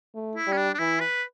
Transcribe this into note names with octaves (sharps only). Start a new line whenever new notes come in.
A3
E4
G3
C#4
D4
D4
E3 E4
B4